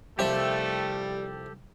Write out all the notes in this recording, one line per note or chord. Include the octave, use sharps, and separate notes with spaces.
C2 F3 G3 A3 G4 A4 E5